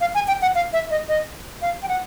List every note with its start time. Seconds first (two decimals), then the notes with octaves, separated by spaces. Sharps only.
0.01 F5
0.15 G#5
0.28 G5
0.42 F#5
0.55 F5
0.73 E5
0.91 D#5
1.08 D#5
1.62 F5
1.83 G5
1.88 F#5